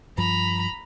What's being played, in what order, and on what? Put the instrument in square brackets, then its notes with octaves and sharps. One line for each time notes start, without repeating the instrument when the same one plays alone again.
[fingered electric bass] G2 F3 [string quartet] A#5 B5